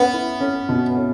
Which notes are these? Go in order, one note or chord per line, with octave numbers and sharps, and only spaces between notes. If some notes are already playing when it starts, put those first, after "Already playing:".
Already playing: B3 C#4
E4
C#4
B2
C#4